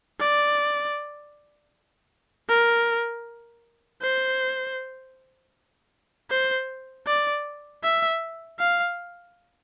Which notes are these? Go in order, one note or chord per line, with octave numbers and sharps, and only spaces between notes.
D5
A#4
C5
C5
D5
E5
F5